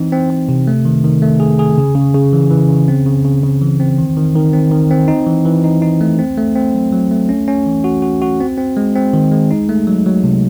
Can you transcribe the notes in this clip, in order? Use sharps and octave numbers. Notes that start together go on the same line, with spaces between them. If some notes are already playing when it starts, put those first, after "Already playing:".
Already playing: E3 C4 D#4
C4
C4
C3
A3
D#3
D#3
A3
G#4
G#4
C#3
C#3
C#3
E3
E3
C#3
C4
C#3
C#3
C#3
E3
C4
D#3
D#3
D#3
C4
D#3
C4
D#4
E3
E3
D#4
D#4
A3
C4
A3
C4
F#3
F#3
A3
C#4
C#4
E3
F#4
F#4
F#4
C4
C4
G#3
C4
D#3
G#3
D#4
A3
F#3
F#3
C3